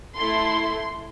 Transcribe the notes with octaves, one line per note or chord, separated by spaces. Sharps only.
A3 E4 A4 C6